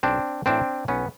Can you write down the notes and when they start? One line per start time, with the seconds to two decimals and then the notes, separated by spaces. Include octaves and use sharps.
0.03 B1 C4 D4
0.46 A2 E3 C4 D4
0.88 B1 B3 C#4